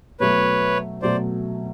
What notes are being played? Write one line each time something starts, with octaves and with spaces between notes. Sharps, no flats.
B2 F#3 A3 B4 C#5
B2 F#3 A3 C5 D5